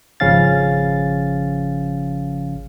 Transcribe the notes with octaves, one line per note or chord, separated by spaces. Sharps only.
G#1 C#3 F3 C#4 F5 A6